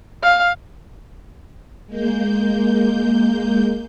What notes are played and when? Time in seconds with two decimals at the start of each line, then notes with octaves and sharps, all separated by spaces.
0.23 F5
1.87 G#3 A#3 G6